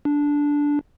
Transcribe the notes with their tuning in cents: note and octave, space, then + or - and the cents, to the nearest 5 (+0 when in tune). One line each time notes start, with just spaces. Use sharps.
D4 -10